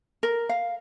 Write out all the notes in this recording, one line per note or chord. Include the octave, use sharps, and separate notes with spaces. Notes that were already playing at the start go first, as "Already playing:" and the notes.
A#4
F5